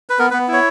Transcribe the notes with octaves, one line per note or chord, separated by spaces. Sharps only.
B4
B3 A#4
B3 B4
E4 C#5